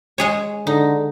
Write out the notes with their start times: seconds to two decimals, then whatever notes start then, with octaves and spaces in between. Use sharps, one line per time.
0.18 G#3 G#4 C#5
0.67 D3 D#4